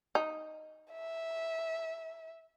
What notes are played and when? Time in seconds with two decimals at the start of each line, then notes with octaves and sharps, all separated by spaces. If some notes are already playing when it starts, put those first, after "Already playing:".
0.15 D#4
0.92 E5